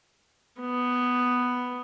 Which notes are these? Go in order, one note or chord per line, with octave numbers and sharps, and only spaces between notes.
B3